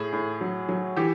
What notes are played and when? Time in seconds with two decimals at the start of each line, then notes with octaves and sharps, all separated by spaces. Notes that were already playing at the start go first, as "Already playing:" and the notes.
Already playing: A2 G#4
0.13 A2
0.41 F#3
0.69 F#3
0.96 E3 G4